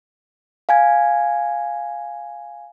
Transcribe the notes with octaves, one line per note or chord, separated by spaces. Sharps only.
F5 G#5 G#6